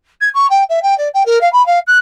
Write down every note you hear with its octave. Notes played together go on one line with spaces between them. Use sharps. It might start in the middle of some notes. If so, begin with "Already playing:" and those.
G#6
C#6
G5
E5
G5
D5
G5
A#4
F5
B5
F5
F#6